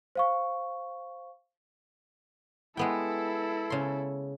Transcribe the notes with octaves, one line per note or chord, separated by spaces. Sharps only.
C5 F5 C#6
G#3 B3 E4 A4 G5
C#3 C6